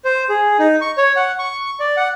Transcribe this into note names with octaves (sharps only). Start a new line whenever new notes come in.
C5
G#4
D#4
C#6
C#5
F#5
C#6
D5
F#5